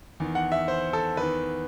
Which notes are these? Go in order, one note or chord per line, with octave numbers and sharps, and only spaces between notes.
E2 D#3
F#5
E5
C5
A4
E2 D#3 B4